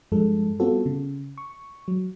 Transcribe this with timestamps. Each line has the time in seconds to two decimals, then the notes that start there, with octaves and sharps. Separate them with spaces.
0.12 G2 F3 G#3 A4
0.60 G3 B3 C4 F4 F#4 A4
0.86 C#3
1.38 C#6
1.88 F#3